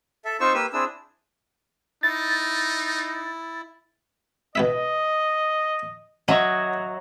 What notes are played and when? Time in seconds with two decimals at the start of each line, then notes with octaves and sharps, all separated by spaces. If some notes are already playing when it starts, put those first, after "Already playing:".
0.25 A4 E5
0.40 C4 D#4 F4 C5 C#6 E6
0.54 A#3 G4 B4 E6
0.73 C4 D4 E4 G#4 E6
2.03 D#4 E4 A6
4.55 B2 E4 D#5 E5
6.28 F#3 C#4 D#5 E5 C#6